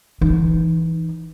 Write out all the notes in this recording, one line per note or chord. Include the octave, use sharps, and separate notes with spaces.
E3 D#4